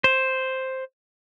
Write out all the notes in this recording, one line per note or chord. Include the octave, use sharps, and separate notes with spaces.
C5